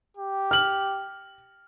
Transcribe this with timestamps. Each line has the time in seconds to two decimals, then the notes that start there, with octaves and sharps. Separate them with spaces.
0.17 G4
0.51 F6 F#7